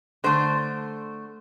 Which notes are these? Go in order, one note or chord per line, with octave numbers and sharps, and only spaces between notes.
D3 A3 C5